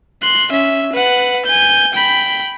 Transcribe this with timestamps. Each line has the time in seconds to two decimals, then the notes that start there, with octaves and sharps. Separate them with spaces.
0.22 C6 F#6
0.51 C#4 E5
0.92 B4 F#5
1.45 G#5 G6
1.93 G5 B5